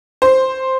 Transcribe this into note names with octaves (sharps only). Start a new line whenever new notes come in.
C5